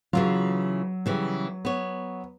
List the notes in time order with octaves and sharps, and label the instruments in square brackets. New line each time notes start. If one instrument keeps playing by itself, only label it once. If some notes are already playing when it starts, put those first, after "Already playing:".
[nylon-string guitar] C#3 E3 F4 [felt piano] F#3
[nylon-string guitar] C#3 E3 G3
B3 C#5